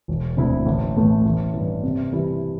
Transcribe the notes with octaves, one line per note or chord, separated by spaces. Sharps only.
E1
D2 D3 C4 E4
A1
A2 E3 A3
A1
G2 E3
C3
E3 G3 E4